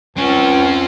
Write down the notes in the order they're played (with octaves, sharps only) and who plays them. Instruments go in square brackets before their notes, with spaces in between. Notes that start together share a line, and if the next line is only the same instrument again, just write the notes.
[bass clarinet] C#2 [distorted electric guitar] C4 F4 [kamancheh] C#4